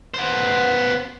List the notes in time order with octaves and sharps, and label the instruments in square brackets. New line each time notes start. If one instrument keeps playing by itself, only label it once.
[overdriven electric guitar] B3 C5